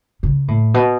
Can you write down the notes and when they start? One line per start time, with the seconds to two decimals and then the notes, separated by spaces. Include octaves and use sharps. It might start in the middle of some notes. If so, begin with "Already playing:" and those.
0.23 C#3
0.48 A2
0.74 B2